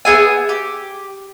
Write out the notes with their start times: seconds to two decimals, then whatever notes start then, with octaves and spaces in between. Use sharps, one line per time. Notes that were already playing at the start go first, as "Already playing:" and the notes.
0.05 B3 G#4 E5 G#5
0.49 G4